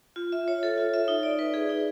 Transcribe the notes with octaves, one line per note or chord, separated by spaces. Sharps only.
F4
E5
C#5
A4
F4
E5
D#4
D5
B4
G#4
D#4